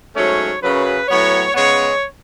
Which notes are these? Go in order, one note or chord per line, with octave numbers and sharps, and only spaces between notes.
G#2 F#3 A3 C#4 C#5
F#2 C#3 F#3 C#4 B4
A2 F#3 B3 C#5
C#3 G#3 B3 C#5